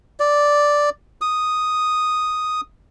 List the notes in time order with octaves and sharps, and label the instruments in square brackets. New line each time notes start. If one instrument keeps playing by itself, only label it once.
[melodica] D5
D#6